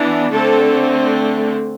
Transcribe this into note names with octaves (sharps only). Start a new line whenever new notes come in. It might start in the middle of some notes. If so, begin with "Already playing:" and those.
Already playing: E3 B3 D4
D3 A3 C4 A4